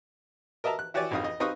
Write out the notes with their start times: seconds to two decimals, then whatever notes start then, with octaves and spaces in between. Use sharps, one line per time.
0.64 A#4 D#5 E5 A5 A#5
0.79 F#6
0.94 E4 F#4 G4 C#5 D5 G#5
1.11 A#1 F2 D#4 F5 D#6
1.24 D#5
1.40 C4 D#4 B4 F5 C#6 D#6